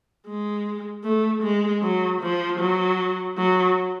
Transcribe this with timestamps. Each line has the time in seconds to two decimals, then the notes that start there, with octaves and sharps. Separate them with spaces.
0.27 G#3
1.03 A3
1.42 G#3
1.82 F#3
2.22 F3
2.60 F#3
3.37 F#3